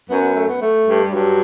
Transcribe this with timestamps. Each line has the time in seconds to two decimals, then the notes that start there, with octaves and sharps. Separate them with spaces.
0.10 F#2 B3
0.22 B3
0.36 A3
0.48 B3
0.61 A3
0.87 G2
1.02 G3
1.13 G2 F#3